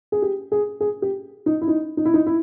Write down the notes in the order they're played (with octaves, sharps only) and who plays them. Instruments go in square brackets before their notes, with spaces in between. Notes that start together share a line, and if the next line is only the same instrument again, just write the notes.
[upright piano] G#4
G4
G#4
G#4
G4
D#4
E4
D#4
D#4
E4
D#4
E4